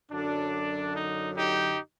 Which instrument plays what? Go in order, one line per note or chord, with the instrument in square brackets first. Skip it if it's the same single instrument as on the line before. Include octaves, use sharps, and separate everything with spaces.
[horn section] F#2 D3 F#3 D4
D#4
D#4 G4